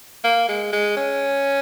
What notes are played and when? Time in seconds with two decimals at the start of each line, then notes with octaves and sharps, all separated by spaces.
0.24 A#3
0.48 G#3
0.73 G#3
0.97 C#4